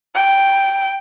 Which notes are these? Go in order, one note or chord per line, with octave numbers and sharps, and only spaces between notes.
G5